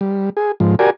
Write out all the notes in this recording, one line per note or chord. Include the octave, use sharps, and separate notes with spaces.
G3
G#4
G#2 F3
F#4 G4 A#4 D5 G#5